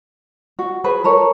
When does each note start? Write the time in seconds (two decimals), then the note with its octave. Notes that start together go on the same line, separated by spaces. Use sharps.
0.59 F#4
0.84 G#4 B4 C5
1.04 A4 A#4 C#5